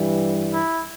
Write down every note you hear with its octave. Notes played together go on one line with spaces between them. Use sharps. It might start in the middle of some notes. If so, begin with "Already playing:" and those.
Already playing: G2 E3 G3
E4